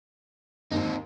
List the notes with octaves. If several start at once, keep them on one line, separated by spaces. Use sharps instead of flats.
D#2 G#2 C4 D#4